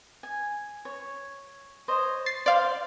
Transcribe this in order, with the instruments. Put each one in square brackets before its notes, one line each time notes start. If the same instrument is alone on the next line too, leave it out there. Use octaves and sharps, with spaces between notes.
[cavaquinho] G#5
C#5
C5 C#5 D#5
[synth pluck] A6 C7
[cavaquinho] C5 [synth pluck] D5 F5